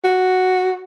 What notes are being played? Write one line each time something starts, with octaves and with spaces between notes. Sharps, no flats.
F#4